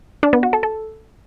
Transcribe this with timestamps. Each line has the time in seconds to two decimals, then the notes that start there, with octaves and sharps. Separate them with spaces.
0.23 D4
0.33 B3
0.43 F#4
0.53 A4
0.63 A4